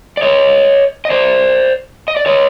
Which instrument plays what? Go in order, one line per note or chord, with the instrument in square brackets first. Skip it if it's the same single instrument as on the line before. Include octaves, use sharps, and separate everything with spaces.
[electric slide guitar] D5
C#5 D#5
D#5
C5 D5
D#5
D5
C#5 D#5